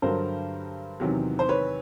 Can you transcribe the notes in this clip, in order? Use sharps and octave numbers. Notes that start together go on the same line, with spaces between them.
G2 D3 F#3 A#4 C5
E2 C3 D#3 F#3
C5
B4 C#5